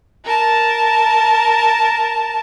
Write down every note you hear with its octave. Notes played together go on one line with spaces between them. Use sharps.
A#4 A5